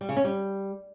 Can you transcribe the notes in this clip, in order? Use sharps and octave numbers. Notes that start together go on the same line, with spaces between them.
G3
C#3
C#4
G3